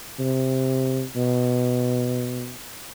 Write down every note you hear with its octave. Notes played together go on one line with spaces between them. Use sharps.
C3
B2